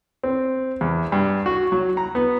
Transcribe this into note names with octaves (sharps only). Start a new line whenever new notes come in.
C4
E2
G2
F#4
F#3
A#5
B3